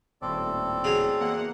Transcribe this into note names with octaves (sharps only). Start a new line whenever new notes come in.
D#1 A2 C4 A4 D5
C#3 F#3
E2 A#3 F#5